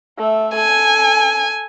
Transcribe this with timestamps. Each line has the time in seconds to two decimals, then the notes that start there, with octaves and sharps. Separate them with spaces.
0.18 A3 E5
0.55 A4 G#5